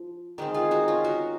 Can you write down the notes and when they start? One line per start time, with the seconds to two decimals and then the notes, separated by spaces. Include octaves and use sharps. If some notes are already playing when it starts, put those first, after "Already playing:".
Already playing: F3
0.38 D#3 G#3 C4
0.54 F4 G#4
0.71 D#4 F#4
0.88 C#4 F4
1.04 F#4 A#4